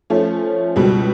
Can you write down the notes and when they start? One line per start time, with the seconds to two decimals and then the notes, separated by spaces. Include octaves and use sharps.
0.10 F3 A3 C#4
0.76 C#2 B2 G3